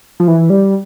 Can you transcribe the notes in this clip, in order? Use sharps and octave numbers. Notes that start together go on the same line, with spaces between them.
F3
E3
G3